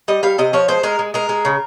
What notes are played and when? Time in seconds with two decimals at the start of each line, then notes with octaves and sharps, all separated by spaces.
0.08 G3 D#5
0.23 G3 F5
0.38 C3 D#5
0.53 F3 C#5
0.68 G#3 C5
0.83 G#3 A#4
0.99 G#3
1.14 G#3 A#4
1.29 G#3
1.45 C#3